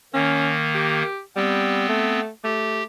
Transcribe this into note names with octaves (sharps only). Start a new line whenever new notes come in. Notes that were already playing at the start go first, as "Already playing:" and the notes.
D#3 A#3 C#4
G4
G3 B3 C4
A3
A3 G4